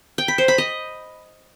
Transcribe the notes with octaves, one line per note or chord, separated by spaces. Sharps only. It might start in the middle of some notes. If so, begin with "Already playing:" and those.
G5
B5
C5
B5
D#5